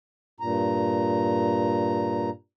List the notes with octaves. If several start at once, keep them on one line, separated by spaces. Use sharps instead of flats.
G2 A#2 A#5